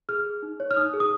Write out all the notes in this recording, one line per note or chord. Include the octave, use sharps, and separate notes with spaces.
G#4 F6
G#4
D#4
C#5
F6
D#4 D#6
G#4
D#6